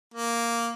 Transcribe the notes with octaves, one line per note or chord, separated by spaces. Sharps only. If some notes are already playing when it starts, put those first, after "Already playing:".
A#3